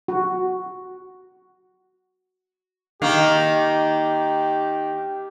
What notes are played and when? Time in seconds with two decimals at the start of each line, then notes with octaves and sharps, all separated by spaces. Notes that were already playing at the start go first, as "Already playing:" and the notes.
0.08 F#4
3.02 D#3 A#3 G4